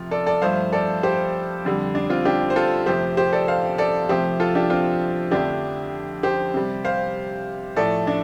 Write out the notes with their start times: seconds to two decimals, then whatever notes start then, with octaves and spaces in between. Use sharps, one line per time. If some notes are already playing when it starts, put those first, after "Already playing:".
Already playing: C3 F3 A3 F4
0.11 A4 D5
0.26 A4 D5
0.42 G2 F3 A3 C5 F5
0.73 A4 D5
1.03 G4 C5
1.65 F2 D3 G3
1.95 D4
2.10 C4 F4
2.25 D4 G4
2.50 C5
2.56 F4 A4
2.86 F2 C3 F3 A3 G4 C5
3.17 G4 C5
3.33 A4 D5
3.48 C5 F5
3.78 A4 D5
4.09 C3 F3 A3 G4 C5
4.40 F4 A4
4.55 D4 G4
4.70 C4 F4
5.31 F2 D3 F3 A3 D4 G4
6.23 G4 C5
6.54 C3 G3
6.85 C5 F5
7.76 A2 F3 A3 A4 D5
8.07 D4